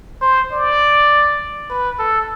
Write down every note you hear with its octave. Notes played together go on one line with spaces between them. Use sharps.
C5
D5
B4
A4